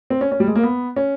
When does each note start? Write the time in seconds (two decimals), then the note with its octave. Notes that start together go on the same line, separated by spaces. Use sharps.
0.10 C4
0.21 C#4
0.32 C#4
0.40 G3
0.48 G#3
0.55 A#3
0.63 B3
0.96 C#4